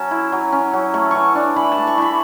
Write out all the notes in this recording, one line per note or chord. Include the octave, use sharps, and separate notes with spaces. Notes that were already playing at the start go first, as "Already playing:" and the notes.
Already playing: F#3 C#4 A5
E4
F#3
C#4
F#3
A3 C#6
E3 C#6
D4
E3 B5
A5
A3
C#6
E3 B5